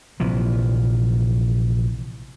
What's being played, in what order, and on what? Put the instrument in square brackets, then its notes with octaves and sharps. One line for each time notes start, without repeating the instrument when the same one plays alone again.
[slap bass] A#1 C3 E3 F3